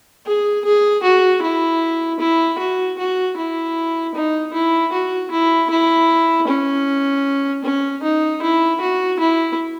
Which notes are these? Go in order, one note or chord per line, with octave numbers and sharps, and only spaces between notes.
G#4
G#4
F#4
E4
E4
F#4
F#4
E4
D#4
E4
F#4
E4
E4
C#4
C#4
D#4
E4
F#4
E4